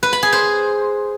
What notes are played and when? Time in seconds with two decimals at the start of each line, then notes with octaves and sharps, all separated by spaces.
0.03 B4
0.13 B5
0.23 G#4
0.33 C5